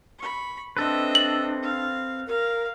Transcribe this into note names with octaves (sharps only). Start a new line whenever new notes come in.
B5 C#6
C4 D4 A4 B4 D#5 E5
F#7
F5
A#4 F5